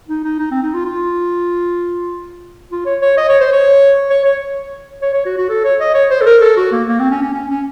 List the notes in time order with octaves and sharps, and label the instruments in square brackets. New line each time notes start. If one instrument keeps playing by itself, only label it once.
[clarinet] D#4
D#4
D#4
C4
D#4
F4
F4
F4
C#5
C#5
D#5
C#5
C5
C#5
C#5
C#5
C#5
C#5
F#4
F#4
A4
C#5
D#5
C#5
C5
A4
A#4
A4
F#4
A#3
A#3
C4
C#4
C#4
C#4
C#4